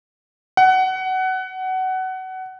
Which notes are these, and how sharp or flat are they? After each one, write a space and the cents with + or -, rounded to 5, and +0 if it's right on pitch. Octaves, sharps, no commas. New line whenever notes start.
F#5 +20